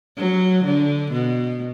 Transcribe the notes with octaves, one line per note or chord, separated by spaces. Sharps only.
F#3
D3
B2